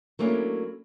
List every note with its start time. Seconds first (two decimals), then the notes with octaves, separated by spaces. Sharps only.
0.19 F#3 A3 A#3 C#4 D4 E4